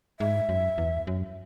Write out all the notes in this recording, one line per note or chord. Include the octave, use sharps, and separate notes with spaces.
G#2 E5
F#2
E2
F#2